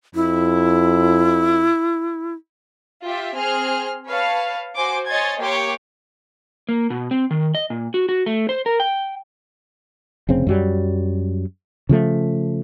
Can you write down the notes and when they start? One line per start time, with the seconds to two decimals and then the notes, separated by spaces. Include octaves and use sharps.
0.15 F2 E4
3.06 F4 G4 E5
3.37 C4 G#4 C6 F6
4.08 B4 C#5 F5 A5
4.76 F#4 C5 G#5 D6
5.08 C#5 D#5 G#5 C6 G#6 A6
5.42 A#3 G4 C#5 G5 C6 D6
6.69 A#3
6.90 B2
7.11 C4
7.31 D#3
7.55 D#5
7.70 A#2
7.94 F#4
8.09 F#4
8.26 A3
8.49 C5
8.66 A#4
8.80 G5
10.29 F1 C#3 C4
10.47 F#2 F#3 G3
11.89 C#3 F3 A3